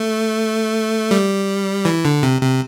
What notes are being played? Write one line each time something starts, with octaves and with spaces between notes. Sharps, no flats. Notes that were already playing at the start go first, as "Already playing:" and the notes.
Already playing: A3
G3
E3
D3
C3
C3